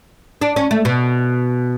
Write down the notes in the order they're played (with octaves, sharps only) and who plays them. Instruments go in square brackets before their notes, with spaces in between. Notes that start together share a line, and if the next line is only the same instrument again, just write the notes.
[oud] D4
C#4
A3
B2